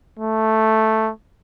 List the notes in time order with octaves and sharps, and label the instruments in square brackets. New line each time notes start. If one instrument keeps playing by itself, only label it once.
[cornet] A3